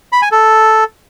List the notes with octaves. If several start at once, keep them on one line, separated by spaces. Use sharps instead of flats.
B5
G#5
A4